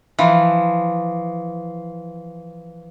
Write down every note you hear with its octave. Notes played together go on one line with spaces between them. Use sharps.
E3 F3